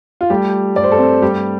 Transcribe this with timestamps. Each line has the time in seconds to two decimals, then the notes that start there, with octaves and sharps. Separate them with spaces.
0.21 F4
0.30 G3 A3 G4
0.76 G2 D5
0.84 C5
0.92 A4
0.98 C4 C5
1.22 G3 A3 G4